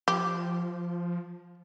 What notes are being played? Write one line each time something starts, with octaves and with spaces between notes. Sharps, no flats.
F3 G4